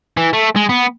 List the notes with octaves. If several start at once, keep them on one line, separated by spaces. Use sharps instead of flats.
E3
A3
G#3
B3